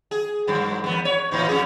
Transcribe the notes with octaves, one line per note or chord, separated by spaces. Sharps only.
G#4
G2 D#3 F#3
E2 B3
C#5
A2 E3 D#4
F2 C#4 G#4